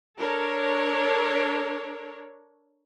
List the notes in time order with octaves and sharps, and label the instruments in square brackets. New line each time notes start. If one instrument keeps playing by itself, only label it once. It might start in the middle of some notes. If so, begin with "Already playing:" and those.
[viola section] D4 A4 A#4 C#5